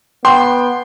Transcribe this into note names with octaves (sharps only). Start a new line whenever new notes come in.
B3 G5 C6